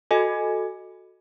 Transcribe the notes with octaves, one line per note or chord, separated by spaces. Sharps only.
F#4 A4 D#5 G#5